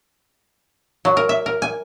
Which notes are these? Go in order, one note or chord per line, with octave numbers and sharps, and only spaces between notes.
F#3
A#4
E5
A#4
G#5